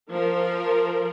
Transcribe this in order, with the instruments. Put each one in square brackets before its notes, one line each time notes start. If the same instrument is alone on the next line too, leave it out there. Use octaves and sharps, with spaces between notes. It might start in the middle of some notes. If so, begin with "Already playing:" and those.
[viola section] F3 A#4